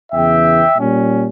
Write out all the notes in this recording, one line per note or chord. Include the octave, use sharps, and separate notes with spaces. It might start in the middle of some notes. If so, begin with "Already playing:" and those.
E2 C#3 E3 E5 G5
A#2 G3 C#4